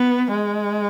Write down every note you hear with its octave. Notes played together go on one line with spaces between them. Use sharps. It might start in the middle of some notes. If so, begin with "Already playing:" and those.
Already playing: B3
G#3